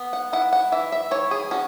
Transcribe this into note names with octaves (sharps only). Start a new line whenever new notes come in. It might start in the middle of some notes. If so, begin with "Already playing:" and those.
Already playing: B3
F#5
E4 F#5
F#5
E3 E5
E5
E3 C#5
G#4
C#4 F#4